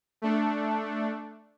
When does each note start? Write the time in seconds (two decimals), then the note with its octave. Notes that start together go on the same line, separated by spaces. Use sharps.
0.22 A3 D4